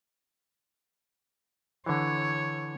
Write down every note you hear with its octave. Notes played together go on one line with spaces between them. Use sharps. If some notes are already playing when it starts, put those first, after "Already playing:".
D3 E3 C#5